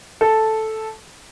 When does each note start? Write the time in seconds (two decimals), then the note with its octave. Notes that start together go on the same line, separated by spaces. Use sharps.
0.21 A4